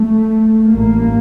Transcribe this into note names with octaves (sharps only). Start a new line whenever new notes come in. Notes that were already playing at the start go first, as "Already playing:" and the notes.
Already playing: A3
A1 G2 A#3